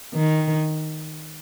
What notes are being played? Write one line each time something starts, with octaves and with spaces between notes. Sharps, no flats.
D#3